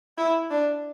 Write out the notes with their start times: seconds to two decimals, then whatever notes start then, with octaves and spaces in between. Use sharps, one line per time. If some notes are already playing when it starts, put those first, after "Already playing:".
0.18 E4
0.51 D4